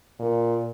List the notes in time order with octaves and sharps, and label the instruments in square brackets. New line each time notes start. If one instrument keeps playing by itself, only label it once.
[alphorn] A#2